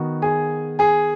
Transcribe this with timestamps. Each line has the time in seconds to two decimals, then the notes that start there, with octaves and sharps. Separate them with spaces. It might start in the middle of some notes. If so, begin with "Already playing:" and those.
Already playing: D#3 B3 D#4 F#4
0.22 G#4 G#5
0.79 G#4 G#5